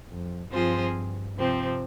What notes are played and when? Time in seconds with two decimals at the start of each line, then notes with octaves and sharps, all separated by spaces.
0.09 F2
0.51 G2 F3 C4 F4 G#4 C5
1.36 C3 F3 C4